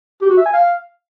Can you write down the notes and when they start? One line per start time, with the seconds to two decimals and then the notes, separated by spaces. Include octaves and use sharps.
0.21 G4
0.29 F#4
0.37 E5
0.45 G#5
0.53 F5